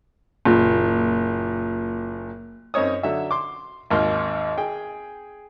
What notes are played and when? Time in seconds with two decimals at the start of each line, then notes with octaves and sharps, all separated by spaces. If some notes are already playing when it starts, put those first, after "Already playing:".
0.45 F#1 A#2
2.74 F#2 C4 D#4 C#5 D#6
3.03 D3 F#3 E5
3.31 C6 D6
3.90 G#1 D#2 C6 F6
4.58 G#4 G5